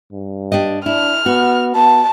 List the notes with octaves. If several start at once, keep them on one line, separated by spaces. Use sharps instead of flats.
G2
D4 G4 D#5
D4 E4 F6
B3 F#4
B3 A5